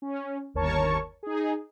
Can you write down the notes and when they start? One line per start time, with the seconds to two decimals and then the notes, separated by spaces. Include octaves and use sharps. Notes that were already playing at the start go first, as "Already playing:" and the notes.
0.02 C#4
0.54 G1 D#2 A#4 C#5 A5 C#6
1.23 D#4 G#4